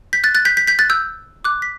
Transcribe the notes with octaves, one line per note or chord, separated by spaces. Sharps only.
G6 B6
F#6 A6
F#6 A6
G6 B6
G6 B6
G6 B6
F#6 A6
E6 G6
D6 F#6
B6